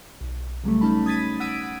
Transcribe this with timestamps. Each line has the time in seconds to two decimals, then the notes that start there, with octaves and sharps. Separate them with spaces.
0.21 B1
0.64 C#3 F#3 G3 A3
0.81 C#4 D#4 A5 B5
1.06 D#6 G#6 A6 B6 D#7
1.40 F#5 E6 G#6 B6 D7 D#7